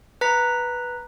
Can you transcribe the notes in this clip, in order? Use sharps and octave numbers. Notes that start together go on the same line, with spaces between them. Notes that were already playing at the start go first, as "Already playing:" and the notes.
B4 A#5 B6